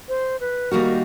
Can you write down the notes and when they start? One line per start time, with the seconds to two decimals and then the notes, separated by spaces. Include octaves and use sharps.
0.08 C5
0.40 B4
0.71 D#3 G3 A#3 D#4 F#4 A#4